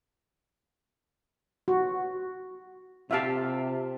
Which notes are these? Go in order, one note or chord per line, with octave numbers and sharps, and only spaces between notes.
F#4
C3 F4 G4 E5 F5 A5